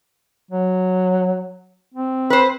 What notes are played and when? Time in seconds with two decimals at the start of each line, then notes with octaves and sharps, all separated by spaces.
0.51 F#3
1.94 C4
2.30 B4 C5